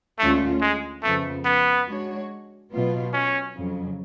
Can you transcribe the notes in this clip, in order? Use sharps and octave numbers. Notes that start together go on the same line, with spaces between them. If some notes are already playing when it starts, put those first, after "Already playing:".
D2 D3 G#3 A3 C#4 F4
G#3
F2 C#3 F3 A3 B3
B3
G#3 D4 F#4 C#5
B2 F#3 B3 F4
C#4
F2 C#3 F#3